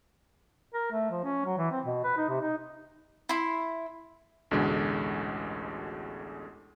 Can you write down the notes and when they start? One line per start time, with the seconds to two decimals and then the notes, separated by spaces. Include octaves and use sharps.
0.74 A#4
0.92 A3
1.11 F3
1.24 C#4
1.45 F#3
1.58 E3
1.72 C4
1.85 B2
2.04 B4
2.17 D#4
2.29 C3
2.41 D#4
3.29 E4 C6
4.51 A1 D2 B2 D3 G#3